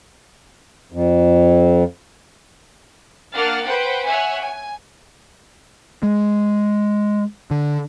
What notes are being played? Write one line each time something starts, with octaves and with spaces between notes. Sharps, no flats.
F2
A#3 D4 F#5 F6 A6
B4 C5 F#5 G5
C#5 E5 F#5 G#5
G#5
G#3
D3